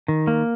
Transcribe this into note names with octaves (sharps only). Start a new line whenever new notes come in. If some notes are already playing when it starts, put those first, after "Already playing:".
D#3
A#3